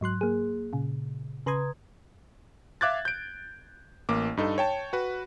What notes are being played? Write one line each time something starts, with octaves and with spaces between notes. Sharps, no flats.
G#2 F#3 C6 F#6
A#3 G#4
A#2 C#3
C#3 B4 A#5 C6 D#6 G#6
E5 F5 D6 F#6 G#6 A6
G6 D7
A1 A#3 D6
G2 D#4 A4
C#5 G5 A5
F#4 B4